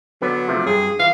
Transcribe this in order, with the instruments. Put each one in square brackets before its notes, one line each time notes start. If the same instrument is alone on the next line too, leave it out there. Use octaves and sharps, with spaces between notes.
[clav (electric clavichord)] D3 B3 B4 [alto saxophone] F#3
[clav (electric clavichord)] C3 F3 A3
[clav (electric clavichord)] G2 [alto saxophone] G#4
[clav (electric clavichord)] E3 [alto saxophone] F5